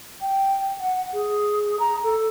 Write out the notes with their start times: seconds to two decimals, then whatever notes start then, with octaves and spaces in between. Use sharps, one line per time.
0.21 G5
0.80 F#5
1.13 G#4
1.79 A#5
2.03 A4